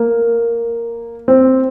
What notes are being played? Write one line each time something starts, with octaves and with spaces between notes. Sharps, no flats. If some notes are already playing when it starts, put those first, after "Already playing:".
Already playing: A#3
C4